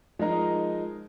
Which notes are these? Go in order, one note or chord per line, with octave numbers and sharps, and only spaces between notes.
F3 G#3 D#4 A#4